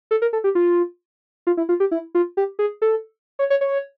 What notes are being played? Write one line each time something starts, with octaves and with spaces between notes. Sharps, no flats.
A4
A#4
A4
G4
F4
F4
E4
F4
G4
E4
F4
G4
G#4
A4
C#5
C#5
C#5